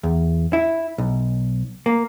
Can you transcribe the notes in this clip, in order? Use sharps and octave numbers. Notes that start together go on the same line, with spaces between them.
E2
E4
B1
A#3